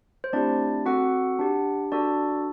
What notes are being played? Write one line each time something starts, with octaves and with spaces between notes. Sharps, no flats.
C5
A3 C4 D4 E4 G4 D5
C4 F#4 A4 F#5
D4 G4
D4 F#4 A4 D5